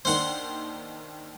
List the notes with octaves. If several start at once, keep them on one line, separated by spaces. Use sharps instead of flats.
D#2 D#3 D4 C5 F#5 C6